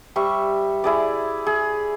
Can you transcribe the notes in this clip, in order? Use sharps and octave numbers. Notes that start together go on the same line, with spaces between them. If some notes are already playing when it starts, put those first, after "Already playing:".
G3 C5 E5 C#6
E4 G#4 D5
G#4